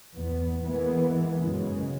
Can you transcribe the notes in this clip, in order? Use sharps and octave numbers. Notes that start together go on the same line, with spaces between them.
E2 B3
E3 G#3 A#3 B3
F#2 C#3 G#3